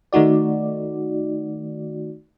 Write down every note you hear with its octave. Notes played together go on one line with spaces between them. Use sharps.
D#3 A3 D#4 F#4 D5